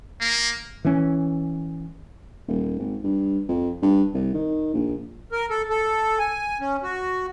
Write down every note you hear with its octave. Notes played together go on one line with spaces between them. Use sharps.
A#3
E3 C#4
D#1
G#1
G2
F2
G2
C2
D#3
A#1
A#4
A4
A4
G#5
C#4
F#4